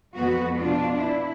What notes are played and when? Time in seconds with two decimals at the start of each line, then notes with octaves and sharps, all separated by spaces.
0.15 F2 B3 F#4
0.57 B2 D4 F4
0.97 E4